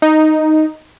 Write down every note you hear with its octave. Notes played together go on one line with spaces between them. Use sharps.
D#4